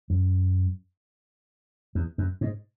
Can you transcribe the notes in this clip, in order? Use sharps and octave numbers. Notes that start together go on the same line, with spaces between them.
F#2
E2
F#2
G#2